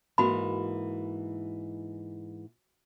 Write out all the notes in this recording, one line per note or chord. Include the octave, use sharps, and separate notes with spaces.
G#2 E3 A#3 F#4 B5